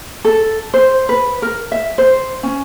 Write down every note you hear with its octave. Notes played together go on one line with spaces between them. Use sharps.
A4
C5
B4
A#4
E5
C5
C#4